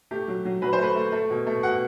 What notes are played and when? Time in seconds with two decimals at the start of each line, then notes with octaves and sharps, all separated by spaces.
0.11 A3 G4
0.28 F#3
0.45 F#3
0.62 F#3 B4
0.73 C5
0.79 A3 B4
0.95 A3
1.12 A3
1.30 B2
1.47 A3
1.63 B2 F#5